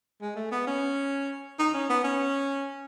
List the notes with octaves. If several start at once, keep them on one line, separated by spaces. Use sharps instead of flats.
G#3
A3
B3
C#4
D#4
C#4
B3
C#4